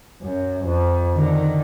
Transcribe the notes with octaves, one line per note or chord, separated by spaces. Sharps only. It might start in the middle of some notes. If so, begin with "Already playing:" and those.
F#2
F2
D3 D#3